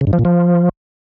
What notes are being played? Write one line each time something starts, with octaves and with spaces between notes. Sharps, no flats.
C#3
G2
F3
A#2
F3